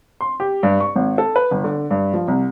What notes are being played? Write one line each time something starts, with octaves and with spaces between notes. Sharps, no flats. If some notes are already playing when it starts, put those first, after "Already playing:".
C6
G4
G2
C#6
G#1
A4
B4
G1
D3
G2
F3
C2